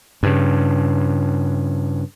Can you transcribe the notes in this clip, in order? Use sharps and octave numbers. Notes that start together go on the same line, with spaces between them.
G2 C#3